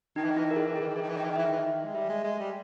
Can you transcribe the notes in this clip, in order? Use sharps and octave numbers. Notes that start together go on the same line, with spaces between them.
D#3 D#4
E3
D#3
E3 E4
D#3
E3 A#4
G#4
D#3
E3
D#3 G#4
E3
D#3
E3 G#4
D#3
E3
D#3 G5
E3
D#3
E3 E5
D#3
E3
D#3
G#3
G3 E5
G#3
G#3
G3